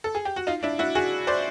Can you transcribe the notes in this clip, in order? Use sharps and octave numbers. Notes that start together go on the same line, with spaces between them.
A4
G#4
G4
F#4
D#4 F4
D4 E4
E4 F#4
F#4 G#4
C5 D5